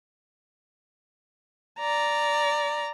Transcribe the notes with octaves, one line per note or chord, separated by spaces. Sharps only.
D5 A#5